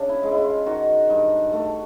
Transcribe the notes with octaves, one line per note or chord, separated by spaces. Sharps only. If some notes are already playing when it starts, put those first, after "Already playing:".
Already playing: C#3 D4
E4
G#3
E4
F4
D#3 F#4
G2
A3